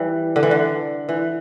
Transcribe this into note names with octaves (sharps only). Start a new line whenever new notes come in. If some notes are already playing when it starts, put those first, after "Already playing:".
Already playing: E3 G3
D3
E3
D3
E3